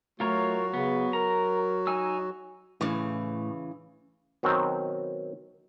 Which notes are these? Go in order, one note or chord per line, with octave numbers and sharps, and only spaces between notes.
F#3 A3 F4 F#4 A#4 C#5
C#3 B3
A#4 A#5
D#4 G#5 E6
A2 C#3 E3
B2 D#3 F#3 C4